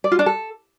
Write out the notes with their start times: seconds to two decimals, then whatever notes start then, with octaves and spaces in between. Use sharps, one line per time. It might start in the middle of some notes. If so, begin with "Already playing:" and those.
0.04 D5
0.12 F4
0.19 D4
0.26 A4